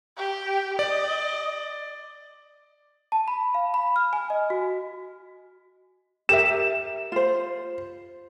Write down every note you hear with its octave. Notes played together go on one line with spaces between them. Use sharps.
G4
D5 D#5
A5
B5
F5
B5
F6
G#5
D#5
F#4
G4 A#4 E5 E7
F4 C5